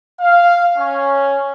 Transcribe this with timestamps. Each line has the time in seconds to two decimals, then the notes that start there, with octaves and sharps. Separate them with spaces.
0.21 F5
0.77 C#4